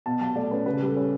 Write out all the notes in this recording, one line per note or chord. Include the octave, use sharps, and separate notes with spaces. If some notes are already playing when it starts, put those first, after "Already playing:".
B2 A5
F#3 A5
A3 D5
C#4 B4
C#3 B4
G3
A4
C#4